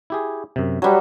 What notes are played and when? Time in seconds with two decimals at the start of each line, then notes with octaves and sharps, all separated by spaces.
0.10 E4 G4 G#4
0.56 F#2 C3
0.82 F#3 G3 G4 B4 G#5